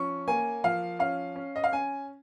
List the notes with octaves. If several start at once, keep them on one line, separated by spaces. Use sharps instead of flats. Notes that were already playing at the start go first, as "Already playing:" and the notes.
Already playing: F3 C#4 C#6
A#3 G#5
F3 F5
C#4 F5
C#4
D#5
F5
C#4 G#5